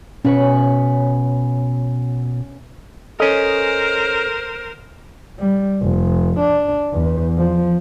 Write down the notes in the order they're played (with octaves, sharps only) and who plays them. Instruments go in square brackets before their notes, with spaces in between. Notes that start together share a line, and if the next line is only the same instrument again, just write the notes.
[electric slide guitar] B2 B4 C#5 [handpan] C#4
[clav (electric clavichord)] C#4 D#5 [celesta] A4 [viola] A#4 C5
[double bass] G3
F1
D4
E2
F3